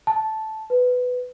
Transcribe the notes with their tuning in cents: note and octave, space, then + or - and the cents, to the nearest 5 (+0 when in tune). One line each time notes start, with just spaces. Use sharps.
A5 -10
B4 +10